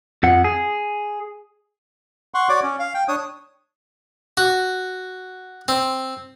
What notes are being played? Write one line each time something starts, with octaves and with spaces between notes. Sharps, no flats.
F2 F3 F#5
G#4
F#5 C6 C#6
F#4 C#5 D5 D6
C#4
F5
G5
D4 C#5 D#6
F#4
C4